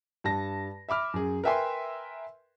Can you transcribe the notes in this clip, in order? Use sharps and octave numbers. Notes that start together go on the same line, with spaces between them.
G2 A5 A#6
E5 B5 D6 F6
F#2 G#4
A#4 B4 E5 G5 G#5 C6